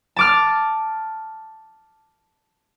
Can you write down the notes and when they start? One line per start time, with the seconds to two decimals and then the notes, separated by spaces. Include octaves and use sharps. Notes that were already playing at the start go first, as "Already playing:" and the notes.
0.16 A5 D6 F6